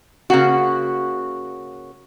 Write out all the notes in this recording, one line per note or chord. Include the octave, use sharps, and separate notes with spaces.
C#3 A#3 F#4